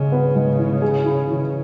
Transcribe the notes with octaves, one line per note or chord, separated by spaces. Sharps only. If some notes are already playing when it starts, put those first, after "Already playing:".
Already playing: G#2 C#3 G#4
B3
G#2
E3
G#4
E4
E3